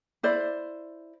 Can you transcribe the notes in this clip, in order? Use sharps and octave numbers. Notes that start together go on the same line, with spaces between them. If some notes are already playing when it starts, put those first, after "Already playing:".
E4 C5 D5